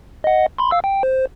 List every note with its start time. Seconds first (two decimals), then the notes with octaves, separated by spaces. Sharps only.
0.24 D#5 F#5
0.58 B5 C6
0.71 F5 E6
0.84 G5
1.03 C5